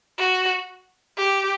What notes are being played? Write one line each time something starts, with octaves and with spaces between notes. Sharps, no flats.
F#4
G4